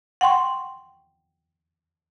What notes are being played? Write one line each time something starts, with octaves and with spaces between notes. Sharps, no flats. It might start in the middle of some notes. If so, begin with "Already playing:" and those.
F#5 G5 C6 C#6